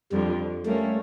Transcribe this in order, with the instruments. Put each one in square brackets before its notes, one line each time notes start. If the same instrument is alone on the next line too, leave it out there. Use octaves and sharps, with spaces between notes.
[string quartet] F2 D3 F3 [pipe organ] G3
[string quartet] G3 A#3 C#4 [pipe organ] A3